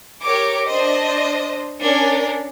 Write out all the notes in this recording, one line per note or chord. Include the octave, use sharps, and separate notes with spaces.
G4 A#4 C#5 D6
D4 C5 D#5
C#4 D4 A#4